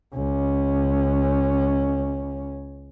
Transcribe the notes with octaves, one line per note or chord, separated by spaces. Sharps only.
C#2 C#4